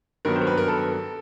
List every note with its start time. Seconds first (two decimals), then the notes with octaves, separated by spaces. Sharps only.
0.25 G2 D#3 F#3 B3 A#4
0.36 C5
0.42 A#4
0.47 B4
0.58 A#4
0.68 A4